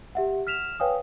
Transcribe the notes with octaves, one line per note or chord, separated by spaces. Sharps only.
G4 E5 F#5
F6 B6 E7 F7
B4 C#5 F5 G5 G#5 D#6